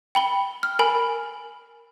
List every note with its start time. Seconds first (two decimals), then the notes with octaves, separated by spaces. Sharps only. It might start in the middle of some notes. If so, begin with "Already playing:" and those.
0.15 G5 B5 G7
0.63 F6
0.79 A#4 G#5 B5